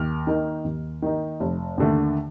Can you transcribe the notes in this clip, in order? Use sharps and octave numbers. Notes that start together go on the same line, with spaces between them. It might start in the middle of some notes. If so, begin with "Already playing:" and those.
Already playing: D#2 F6
D#3 A#3 D#4
D#2
D#3 A#3 D#4
F1
D#2 D3 A3